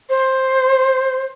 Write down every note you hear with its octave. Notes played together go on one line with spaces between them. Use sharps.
C5